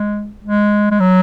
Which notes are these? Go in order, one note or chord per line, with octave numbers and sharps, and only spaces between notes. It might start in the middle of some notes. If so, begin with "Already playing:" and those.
Already playing: G#3
G#3
G#3
F#3